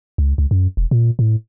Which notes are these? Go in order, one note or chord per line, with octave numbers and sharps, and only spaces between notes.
C#2
C#2
F#2
E1
A#2
A2